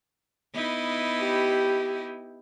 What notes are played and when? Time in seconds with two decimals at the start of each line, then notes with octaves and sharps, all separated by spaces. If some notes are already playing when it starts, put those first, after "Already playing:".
0.54 B3 D#4 E4
1.19 G4